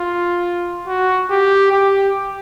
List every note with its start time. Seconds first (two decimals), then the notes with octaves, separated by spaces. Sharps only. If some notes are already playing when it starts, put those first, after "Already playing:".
Already playing: F4
0.88 F#4
1.30 G4
1.72 G4